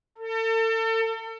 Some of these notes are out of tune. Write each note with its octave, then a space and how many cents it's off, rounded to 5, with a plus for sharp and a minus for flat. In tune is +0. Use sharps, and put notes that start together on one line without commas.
A4 +35